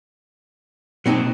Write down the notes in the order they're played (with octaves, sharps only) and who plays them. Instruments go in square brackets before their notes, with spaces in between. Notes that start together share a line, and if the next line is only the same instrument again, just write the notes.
[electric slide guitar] B2 A#3 A5 [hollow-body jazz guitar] F#3 C4 D#4